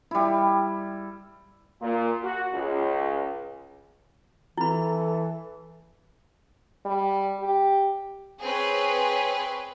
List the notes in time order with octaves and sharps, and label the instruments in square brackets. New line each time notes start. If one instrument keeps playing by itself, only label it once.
[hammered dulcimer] G3 E4
[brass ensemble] A#2
F#4
C#2
[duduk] E3 [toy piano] E4 B5 [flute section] A4
[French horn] G3
G4
[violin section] C4 G#4 B4 C#5